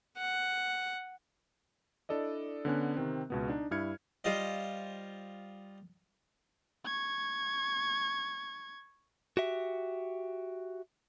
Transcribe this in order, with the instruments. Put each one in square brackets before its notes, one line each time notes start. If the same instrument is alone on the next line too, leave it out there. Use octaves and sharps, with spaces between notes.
[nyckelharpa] F#5
[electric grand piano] D4 E4 A4 D5 D#5
D3 B3 C#4 F#6
C3 D#3 C4
C#2 B2 B3
D4 D#4
G2 E4 F6 G#6 C#7
[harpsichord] G3 F4 C5 D#5
[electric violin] C#6 G#6
[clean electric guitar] F#4 G4 E5